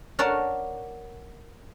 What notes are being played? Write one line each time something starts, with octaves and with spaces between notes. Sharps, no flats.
A#4 C#5 D5 F#5 A5